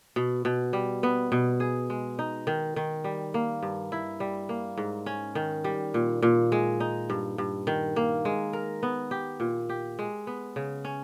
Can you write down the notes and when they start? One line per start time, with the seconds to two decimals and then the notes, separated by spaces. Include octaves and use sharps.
0.16 B2
0.45 B2
0.73 G3
1.03 B3
1.32 B2
1.60 G#4
1.90 G#3
2.19 D#4
2.47 D#3
2.76 D#3
3.04 G3
3.34 A#3
3.63 G2
3.92 E4
4.20 G3
4.49 A#3
4.78 G#2
5.06 C#4
5.35 D#3
5.64 G3
5.94 A#2
6.22 A#2
6.52 G#3
6.80 D#4
7.10 G2
7.38 G2
7.67 D#3
7.96 A#3
8.25 G#3
8.53 A#4
8.83 B3
9.11 G4
9.40 A#2
9.69 G4
9.99 G#3
10.27 B3
10.56 C#3
10.85 C#4